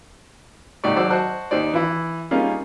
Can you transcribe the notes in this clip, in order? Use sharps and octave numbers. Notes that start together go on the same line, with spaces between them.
C#2 A#2 D#4 G4 D5 C#6
G#1 F#3 C5 D5 F#5 E6
F#4 C5 D#5 A5 F#6
D#2 D#4 C5 D5
E3 E4
G3 A#3 C#4 D#4 F4 G#4